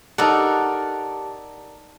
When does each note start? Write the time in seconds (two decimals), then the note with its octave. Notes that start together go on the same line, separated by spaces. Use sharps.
0.18 D#4 G4 A4 A#4 D5 F#5 A5